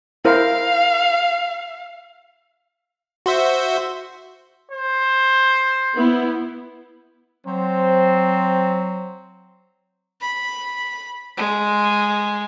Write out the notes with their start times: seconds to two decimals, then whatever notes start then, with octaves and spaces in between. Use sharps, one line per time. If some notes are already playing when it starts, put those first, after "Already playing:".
0.25 E4 A#4 C5 F5
3.26 F#4 C5 E5
4.72 C5
5.94 B3 E4
7.46 F#3 C4 C5
10.21 B5
11.37 G#3